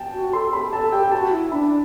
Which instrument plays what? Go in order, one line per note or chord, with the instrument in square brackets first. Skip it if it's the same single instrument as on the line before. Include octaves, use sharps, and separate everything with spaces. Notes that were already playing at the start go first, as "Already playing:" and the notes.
Already playing: [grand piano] G5 A5
[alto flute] F#4
[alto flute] A4 [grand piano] C6
[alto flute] A4
[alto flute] G4 [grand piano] B5
[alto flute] A4 [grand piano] A5
[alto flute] G4 [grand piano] G5
[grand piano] G5
[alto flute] F#4 [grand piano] A5
[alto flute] E4
[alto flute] D4 [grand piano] B5